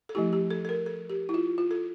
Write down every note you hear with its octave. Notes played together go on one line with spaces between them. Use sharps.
A4
F3 A3 E4 G4
G4
A4
A4
A#4
A4
G4
E4
F4
F4
A4